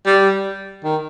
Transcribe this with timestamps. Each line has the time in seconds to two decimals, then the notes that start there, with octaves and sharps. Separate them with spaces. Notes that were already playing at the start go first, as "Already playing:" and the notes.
0.06 G3
0.84 D#3